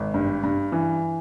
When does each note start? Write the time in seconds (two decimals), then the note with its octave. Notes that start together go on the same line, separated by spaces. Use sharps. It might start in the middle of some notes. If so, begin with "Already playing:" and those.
Already playing: G#1
0.14 G2
0.44 G2
0.72 E3